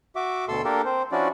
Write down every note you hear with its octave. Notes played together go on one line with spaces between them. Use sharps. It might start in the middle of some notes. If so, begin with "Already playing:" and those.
F#4 E5 D6
D2 B2 A4 C6 E6
A#3 D4 G4 A4 A#4
C4 C5
F3 C#4 D4 E4 F#4 D5